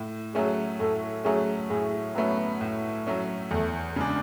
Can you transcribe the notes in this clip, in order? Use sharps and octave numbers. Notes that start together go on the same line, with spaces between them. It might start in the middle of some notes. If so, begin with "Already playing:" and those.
Already playing: A2
F#3 A3 C#4 G#4
A2 A4
F#3 A3 C#4 G#4
A2 G#4
F#3 A3 B3 C#4
A2
F#3 A3 C#4
E2 A3
C#3 G#3 D4